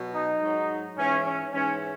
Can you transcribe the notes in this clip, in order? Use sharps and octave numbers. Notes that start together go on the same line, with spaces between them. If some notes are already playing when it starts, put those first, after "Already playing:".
Already playing: B2 F#3
D#4
G#2 F#3
G#2 E3 C#4
C#4
G#2 E3 C#4